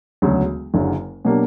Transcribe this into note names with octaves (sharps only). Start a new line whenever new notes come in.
E1 D2 C#3 F#3
F#1 F#2 D3 F#3
B2 F#3 A#3 D4 G4